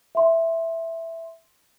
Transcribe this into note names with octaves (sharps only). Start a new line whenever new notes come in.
E5 C6